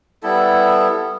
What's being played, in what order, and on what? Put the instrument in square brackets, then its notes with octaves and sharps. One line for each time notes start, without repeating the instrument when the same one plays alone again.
[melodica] G3 B3 E4 A4